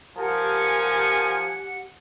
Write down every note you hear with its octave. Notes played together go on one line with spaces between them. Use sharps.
F3 G4 A#4 F#5 G#5